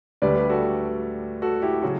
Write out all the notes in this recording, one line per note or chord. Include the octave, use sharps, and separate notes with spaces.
D2 D3 G3 B4 D5
G4 B4
F#4 A4
F#4 A4
E4 G4
C#3 F#3 F#4